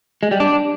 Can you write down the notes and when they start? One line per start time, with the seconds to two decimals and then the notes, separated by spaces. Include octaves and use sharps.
0.23 G#3
0.31 G3
0.40 D4